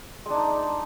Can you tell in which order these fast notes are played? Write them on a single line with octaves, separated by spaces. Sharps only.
G#3 D4 D#4